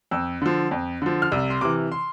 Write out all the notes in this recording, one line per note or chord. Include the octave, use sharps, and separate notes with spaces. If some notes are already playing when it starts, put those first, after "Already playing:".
F2 E6
D3 F3
F2
D3 F3
F6
C2 E6
C6
C3 E3 D6
C6